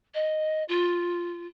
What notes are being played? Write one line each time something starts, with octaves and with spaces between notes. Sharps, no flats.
D#5
F4